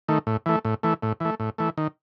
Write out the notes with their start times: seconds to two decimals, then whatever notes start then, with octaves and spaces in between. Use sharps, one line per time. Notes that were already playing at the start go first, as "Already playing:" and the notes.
0.09 D#3 A3
0.27 A2
0.46 E3 A3
0.65 A2
0.83 E3 A3
1.03 A2
1.20 E3 A3
1.40 A2
1.58 E3 A3
1.78 D#3